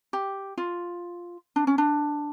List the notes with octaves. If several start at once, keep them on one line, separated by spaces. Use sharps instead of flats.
G4
F4
D4
C#4
D4